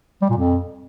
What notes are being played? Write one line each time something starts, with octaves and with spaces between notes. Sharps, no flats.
G3
A#2
F2